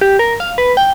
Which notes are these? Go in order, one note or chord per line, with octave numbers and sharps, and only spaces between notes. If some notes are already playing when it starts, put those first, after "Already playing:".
G4
A#4
F5
B4
G5